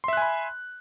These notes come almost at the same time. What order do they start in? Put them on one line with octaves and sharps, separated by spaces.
C6 E5 F#6 G#5 B5